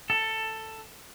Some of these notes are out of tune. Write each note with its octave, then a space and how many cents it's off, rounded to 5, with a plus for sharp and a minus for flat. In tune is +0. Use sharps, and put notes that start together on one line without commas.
A4 +10